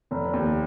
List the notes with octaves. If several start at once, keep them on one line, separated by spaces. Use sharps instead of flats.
F1
D#2